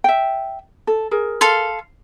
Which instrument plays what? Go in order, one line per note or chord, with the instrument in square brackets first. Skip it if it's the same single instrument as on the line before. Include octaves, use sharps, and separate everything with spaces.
[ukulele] E5 G5
A4
G#4 A#4
[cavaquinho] A4 F5 C6